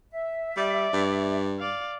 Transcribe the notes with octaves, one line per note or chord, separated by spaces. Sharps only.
E5
G3 D5
G2
D5 F5